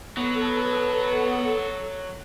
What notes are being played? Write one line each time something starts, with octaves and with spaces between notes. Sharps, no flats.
F#3 B3 A4